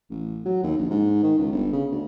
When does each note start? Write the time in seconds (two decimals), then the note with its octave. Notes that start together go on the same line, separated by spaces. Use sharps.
0.11 A1
0.46 F#3
0.63 D#2
0.78 A#1
0.90 G#2
1.23 D#3
1.38 C#2
1.52 G1
1.73 C#3
1.91 D2